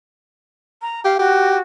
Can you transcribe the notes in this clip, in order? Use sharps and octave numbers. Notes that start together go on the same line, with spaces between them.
A#5
G4 F5
F#4 G4